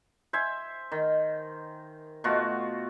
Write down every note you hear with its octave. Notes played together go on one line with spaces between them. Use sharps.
C5 E5 G#5
D#3
B2 A3 F4 F#4